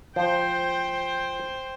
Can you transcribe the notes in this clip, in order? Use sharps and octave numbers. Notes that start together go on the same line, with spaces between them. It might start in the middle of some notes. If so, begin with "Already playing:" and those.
F3 C5 G5